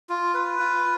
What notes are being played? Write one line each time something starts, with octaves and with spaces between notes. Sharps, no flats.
F4
B4
F4